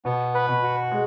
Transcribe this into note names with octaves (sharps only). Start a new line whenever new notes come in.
B2 B3
B4
B2
F#4
G#3